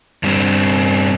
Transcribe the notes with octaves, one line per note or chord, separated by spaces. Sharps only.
G2 D3 G3 C4 D4